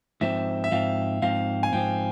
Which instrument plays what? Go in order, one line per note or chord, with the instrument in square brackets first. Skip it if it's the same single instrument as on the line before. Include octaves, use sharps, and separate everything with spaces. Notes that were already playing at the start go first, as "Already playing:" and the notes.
[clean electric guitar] G#2 F3 C4 [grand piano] E5
[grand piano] E5
[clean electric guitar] G#2 F3 C4 [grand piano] F5
[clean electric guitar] G#2 F3 C4 [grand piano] F5
[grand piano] G#5
[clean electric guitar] G#2 F3 C4 [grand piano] G5